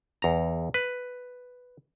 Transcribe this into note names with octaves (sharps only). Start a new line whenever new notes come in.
E2 A#5
B4